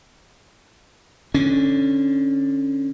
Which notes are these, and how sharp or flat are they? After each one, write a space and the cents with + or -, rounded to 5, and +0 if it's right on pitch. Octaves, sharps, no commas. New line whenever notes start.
D3 +0 C#4 -15